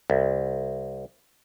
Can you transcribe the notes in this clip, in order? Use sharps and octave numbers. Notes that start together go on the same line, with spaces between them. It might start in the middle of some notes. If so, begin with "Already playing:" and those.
C2